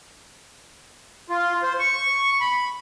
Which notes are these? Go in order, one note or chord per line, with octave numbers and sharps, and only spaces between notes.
F4
C5
C#6
B5